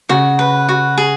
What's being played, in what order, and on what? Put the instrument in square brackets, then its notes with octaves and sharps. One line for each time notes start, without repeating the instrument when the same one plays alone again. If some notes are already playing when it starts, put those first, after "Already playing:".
[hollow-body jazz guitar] C#3 [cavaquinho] F#4
[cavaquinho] B4
F#4
G#4